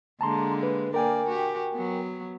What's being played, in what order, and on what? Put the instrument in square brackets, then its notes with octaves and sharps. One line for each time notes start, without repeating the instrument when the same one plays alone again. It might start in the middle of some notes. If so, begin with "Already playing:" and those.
[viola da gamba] D3 G#3 A#3 [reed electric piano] A5 A#5 C6
[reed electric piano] B4
[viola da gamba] A#3 D5 [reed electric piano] A#4 G5 G#5
[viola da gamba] F#4 G4
F#3 B3